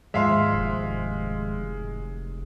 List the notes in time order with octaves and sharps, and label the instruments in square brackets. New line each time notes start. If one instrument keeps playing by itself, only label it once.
[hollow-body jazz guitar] D#2 G#2 F3 [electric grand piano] G#3 [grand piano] E5 F5 C6
[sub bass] F1